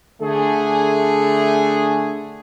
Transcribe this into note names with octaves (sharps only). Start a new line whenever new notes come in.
D3 A3 G#4